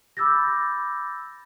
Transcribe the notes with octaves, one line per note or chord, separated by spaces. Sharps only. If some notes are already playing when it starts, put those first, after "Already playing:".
B5 D6 E6 G6 A6 A#6